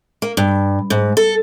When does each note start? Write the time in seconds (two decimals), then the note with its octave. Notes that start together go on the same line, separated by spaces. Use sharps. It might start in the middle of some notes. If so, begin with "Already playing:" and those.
0.22 A#3
0.37 G2
0.90 G#2
1.17 A4